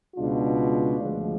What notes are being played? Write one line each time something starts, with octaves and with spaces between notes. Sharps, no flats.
C#2 B2 G#3 D4 F4
D2 C#3 F3 G#3